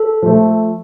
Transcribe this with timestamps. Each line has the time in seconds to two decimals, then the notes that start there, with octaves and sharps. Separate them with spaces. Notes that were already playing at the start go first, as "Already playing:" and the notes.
Already playing: A4
0.22 F3 A3